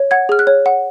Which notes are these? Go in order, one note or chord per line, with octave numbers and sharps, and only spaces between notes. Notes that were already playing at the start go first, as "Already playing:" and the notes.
Already playing: C#5
F#5 G#6
G#4 F6
F#6
C#5
F#5